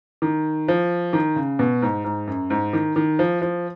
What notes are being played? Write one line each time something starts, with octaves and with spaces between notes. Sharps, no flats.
D#3
F3
D#3
C#3
B2
G#2
G#2
F#2
G#2
D#3
D#3
F3
F3